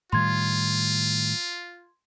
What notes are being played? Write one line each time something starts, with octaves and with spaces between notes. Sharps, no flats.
A2 D#3 G3 F4 C6 G#6